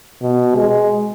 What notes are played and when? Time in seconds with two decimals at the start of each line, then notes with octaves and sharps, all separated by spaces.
0.21 B2
0.55 G#3